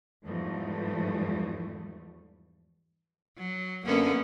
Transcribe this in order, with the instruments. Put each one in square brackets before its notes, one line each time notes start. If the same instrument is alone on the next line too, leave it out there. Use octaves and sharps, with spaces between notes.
[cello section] E2 G#2 E3 F3 G3 A3
[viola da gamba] F#3
[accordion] F#2 D3 [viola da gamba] A#3 B3 C#4